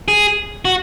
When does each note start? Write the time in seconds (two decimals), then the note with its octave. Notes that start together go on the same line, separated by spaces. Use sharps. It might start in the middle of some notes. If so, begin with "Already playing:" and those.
0.08 G#4
0.65 F#4